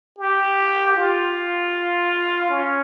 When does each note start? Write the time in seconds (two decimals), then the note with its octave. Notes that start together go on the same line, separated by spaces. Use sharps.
0.19 G4
0.96 F4
2.50 C#4